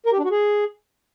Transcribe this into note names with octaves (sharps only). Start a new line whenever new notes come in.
A#4
G4
D4
F#4
G#4